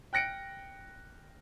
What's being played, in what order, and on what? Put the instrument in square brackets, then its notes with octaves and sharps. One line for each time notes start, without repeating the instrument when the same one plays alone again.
[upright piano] G5 F#6 A#6 C#7 D7